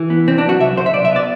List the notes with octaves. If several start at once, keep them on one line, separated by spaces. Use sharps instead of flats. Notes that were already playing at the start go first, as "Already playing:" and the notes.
Already playing: E3
B3
C2 C4
D4
F#3 F#4
C2 E5
C2 C5
E5
B1 D5
E5
B3 D5